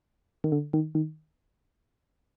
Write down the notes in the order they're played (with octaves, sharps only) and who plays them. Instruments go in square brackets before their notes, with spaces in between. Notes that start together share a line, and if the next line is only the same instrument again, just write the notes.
[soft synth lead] D#3
D3
D#3
D#3